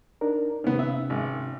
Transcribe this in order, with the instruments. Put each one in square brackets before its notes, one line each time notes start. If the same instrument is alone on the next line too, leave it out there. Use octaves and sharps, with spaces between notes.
[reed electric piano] D4 D#4 A#4
[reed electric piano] C3 C#4 [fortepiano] D#3 B3
[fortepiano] E5
G#1